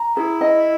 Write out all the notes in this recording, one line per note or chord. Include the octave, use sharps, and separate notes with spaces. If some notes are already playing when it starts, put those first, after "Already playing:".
Already playing: A#5
E4 G#4
D#5